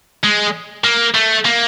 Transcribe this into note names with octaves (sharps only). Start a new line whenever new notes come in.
G#3
A#3
A3
A#3